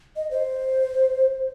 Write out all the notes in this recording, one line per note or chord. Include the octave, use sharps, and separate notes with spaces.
D#5
C5